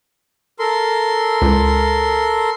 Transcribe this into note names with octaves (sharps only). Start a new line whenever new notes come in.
A4 A#4 C6
C#2